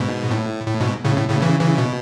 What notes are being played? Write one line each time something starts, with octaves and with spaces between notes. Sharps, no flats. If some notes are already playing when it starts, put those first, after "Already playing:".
Already playing: G#2 B2
A2
A2
G#2 B2
A2 C#3
A2
A2 C#3
C#3 E3
C#3 E3
B2